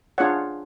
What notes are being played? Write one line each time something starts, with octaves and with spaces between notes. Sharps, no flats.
D4 F4 G#4 C#5 F#5